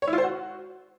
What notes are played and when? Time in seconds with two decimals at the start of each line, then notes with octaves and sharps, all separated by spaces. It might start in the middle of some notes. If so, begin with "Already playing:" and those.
0.02 C#5
0.07 E4
0.13 F4
0.18 C5
0.23 F#4